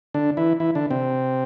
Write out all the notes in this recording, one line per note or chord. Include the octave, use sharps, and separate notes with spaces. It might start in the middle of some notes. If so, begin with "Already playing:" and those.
D3 D4
E3 E4
E3 E4
D3 D4
C3 C4